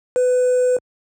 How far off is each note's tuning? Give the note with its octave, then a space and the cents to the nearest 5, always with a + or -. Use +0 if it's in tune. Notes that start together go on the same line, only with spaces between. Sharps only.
B4 +20